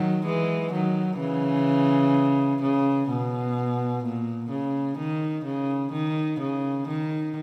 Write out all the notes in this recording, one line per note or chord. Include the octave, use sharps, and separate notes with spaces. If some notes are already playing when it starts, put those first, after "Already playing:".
Already playing: D#3 F#3
E3 G#3
D#3 F#3
C#3 E3
C#3
B2
A#2
C#3
D#3
C#3
D#3
C#3
D#3